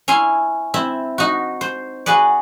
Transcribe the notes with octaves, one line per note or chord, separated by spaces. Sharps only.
C#4 E4 G#5 C6
C4 E4 E5
D#4 F#4
C5
F#4 G#4 B4 D5